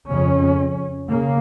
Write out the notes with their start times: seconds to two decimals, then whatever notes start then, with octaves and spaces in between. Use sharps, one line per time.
0.11 F2 C#3 C#4
1.08 C#3 A#3